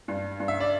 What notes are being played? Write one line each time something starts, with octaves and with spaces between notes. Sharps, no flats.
G2
G2
E5
D5